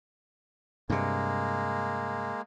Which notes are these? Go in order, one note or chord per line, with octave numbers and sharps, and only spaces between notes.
G2 C3 G#3 A#3